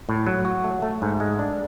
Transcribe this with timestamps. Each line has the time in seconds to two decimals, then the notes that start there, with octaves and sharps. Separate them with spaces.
0.09 A2
0.27 F#3
0.45 F#4
0.64 A3
0.82 A3
1.02 G#2
1.20 G#3
1.39 D4